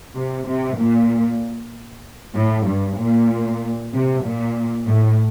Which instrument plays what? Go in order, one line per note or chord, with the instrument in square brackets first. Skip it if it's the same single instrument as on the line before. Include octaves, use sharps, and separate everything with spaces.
[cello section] C3
C3
A#2
A2
G2
A#2
C3
A#2
A2